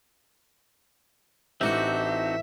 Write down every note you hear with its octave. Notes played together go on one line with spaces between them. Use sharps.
A1 C4 D4 D#4 F#4 E5